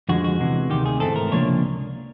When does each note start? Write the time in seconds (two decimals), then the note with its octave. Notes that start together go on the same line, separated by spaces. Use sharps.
0.09 F2 D3 F3 G#3 F#4
0.24 F#4
0.39 E2 C3 E3 G#3
0.70 D2 C3 D#3 G4
0.86 G#4
1.00 G#2 E3 A3 C4 A4
1.16 A#4
1.31 C#2 C3 F3 A#3 D4 C#5